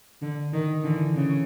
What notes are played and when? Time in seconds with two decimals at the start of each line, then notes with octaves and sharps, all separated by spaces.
0.22 D3
0.53 D#3
0.84 D3 E3
1.15 C#3